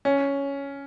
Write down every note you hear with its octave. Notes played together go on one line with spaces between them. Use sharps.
C#4